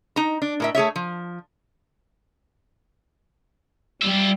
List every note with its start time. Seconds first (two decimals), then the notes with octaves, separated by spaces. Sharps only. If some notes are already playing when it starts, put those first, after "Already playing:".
0.16 D#4 A#5
0.42 D4
0.60 A2 A#4 E5
0.75 A3 G#4 C#5 E5
0.96 F3
4.02 G3 F4 E5